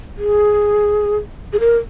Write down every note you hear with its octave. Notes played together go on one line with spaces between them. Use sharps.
G#4
G#4
A#4